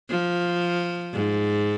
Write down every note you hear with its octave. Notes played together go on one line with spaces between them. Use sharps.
F3
G#2